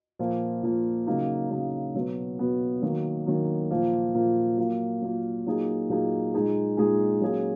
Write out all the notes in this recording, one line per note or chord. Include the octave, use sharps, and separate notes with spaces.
A#2 F3 A#3
A#2 F3 A#3
C#3 F#3 A#3 D#4
C#3 F#3 A#3 D#4
B2 F#3 B3
B2 F#3 B3
D#3 F#3 A#3
D#3 F#3 A#3
A#2 F3 A#3
A#2 F3 A#3
F#3 A#3 F4
F#3 A#3 F4
A#2 F#3 A#3 D#4 G#4
A#2 F#3 A#3 D#4 G#4
A#2 G#3 D#4 G#4
A#2 G#3 D#4 G#4
F#3 A#3 C#4 G#4